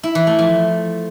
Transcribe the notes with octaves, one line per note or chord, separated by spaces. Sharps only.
E4
E3
A3
F3